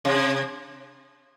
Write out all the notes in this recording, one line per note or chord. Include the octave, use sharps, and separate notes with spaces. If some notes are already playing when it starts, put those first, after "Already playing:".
C3